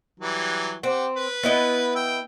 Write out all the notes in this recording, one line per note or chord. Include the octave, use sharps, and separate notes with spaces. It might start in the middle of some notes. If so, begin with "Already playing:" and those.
E3 F#3 G3
C4 G4 F#5
B4
B3 E4 D#5
G5 E6